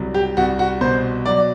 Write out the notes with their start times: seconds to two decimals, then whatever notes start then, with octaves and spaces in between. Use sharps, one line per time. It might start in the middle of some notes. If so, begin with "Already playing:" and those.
Already playing: C2 F#3
0.14 G4
0.37 C2 F#4
0.59 F#4
0.81 B2 C5
1.25 F#3 D5